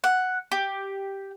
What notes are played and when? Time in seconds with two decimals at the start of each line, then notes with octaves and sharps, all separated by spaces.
0.04 F#5
0.52 G4